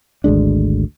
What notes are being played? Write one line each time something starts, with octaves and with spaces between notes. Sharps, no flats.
G#1 D2 G#3 D4